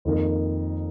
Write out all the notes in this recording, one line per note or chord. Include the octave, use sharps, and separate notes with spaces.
F2 D#3 A#3 D#4 A#4